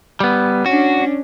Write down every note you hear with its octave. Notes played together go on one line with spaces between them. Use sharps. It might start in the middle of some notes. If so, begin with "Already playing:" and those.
G3 B3
C#4 D4 F#4